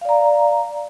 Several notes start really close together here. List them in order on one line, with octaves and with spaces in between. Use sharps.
F5 D5 A#5